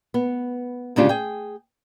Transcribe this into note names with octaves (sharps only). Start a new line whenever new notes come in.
B3
D2 G#2 C#3 D4 F4 G4
G#4 G5